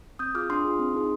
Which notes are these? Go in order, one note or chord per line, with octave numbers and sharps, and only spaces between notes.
C4 D#6 G6
F4 G#4 D6 F6
D4 C6 D#6
F4 G#4
C4
D#4 G#4